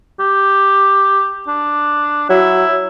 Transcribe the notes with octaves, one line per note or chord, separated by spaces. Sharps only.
G4
D4
F#3 E4